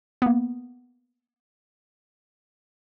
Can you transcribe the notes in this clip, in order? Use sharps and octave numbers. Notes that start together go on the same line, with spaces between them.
A#3 B3